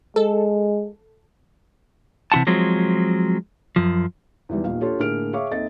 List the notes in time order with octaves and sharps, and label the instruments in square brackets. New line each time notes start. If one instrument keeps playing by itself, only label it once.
[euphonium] G#3 [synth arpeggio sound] A4
[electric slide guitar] C3 E3 F4 F#5 A5
F3 F#3 G#3 C4
F#2 F3
[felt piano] E2 D#3 E3 G3
D#1 A#1 A#2 D#4 F5
D4 F4 G4 A4 C#5
A2 D3 A#3 G#4 F6 D7
G#4 C#5 E5 F5 C#6 D6
D#2 C4 A4 D#5 E5 A6